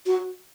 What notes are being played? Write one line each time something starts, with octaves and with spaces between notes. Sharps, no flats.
F#4